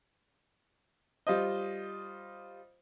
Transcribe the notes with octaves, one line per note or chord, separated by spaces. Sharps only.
G3 F4 C5 D#5